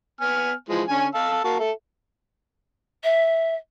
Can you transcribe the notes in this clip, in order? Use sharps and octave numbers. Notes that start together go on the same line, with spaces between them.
B3 G#5 F6
E3 F3 G#3
D3 C#4 G#5
F5 A5 E6
A#3 F#4 A5
A4 E5
E5